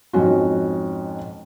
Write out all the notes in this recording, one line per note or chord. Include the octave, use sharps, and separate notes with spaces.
F2 G#2 C#4 F#4